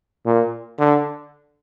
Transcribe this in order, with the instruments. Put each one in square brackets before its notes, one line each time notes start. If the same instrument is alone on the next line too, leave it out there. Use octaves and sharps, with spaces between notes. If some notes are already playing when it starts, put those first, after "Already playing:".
[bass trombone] A#2
D3